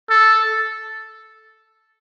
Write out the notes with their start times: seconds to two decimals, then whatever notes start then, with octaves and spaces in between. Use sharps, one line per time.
0.10 A4